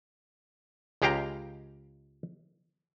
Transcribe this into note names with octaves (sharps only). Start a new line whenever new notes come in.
C#2 G#3 G4 F5 G5 A#5